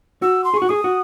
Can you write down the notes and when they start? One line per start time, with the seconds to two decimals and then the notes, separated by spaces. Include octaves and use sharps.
0.22 F#4 E6
0.44 C6
0.54 G#4
0.57 C#6
0.62 F#4
0.69 G#4 D#6
0.84 F#4